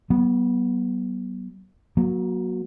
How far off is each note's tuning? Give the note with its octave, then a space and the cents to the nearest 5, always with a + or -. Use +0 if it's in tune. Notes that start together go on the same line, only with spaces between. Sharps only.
F#3 +35 B3 -25
F#3 -10 A#3 +30